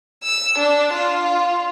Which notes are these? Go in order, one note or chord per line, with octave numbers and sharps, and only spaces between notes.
E6
D4
F4